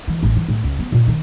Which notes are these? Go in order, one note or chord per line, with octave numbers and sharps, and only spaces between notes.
E3
A1
E3
A2
C#2
B3
A#2
D#3